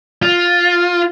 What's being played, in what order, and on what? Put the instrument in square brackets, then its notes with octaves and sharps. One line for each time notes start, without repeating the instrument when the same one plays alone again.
[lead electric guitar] F4